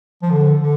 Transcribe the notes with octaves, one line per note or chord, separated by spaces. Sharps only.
F3
D3
D3